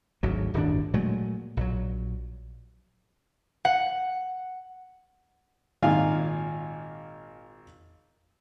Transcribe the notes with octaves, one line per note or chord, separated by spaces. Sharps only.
G#1 D2 F#3
D1 G1 D#3 D4
A#2 F#3 G#3 A3
A#1 F#3
F#5
G#1 A#2 D#3 F4 F5 G#5